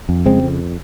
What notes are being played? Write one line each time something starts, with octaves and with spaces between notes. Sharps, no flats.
F2
C#3 G#3 C4
F2